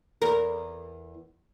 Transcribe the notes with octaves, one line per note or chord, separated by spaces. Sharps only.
E2 A#4